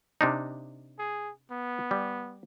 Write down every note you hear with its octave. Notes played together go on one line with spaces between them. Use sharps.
C3 D4 D#4
G#4
B3
G3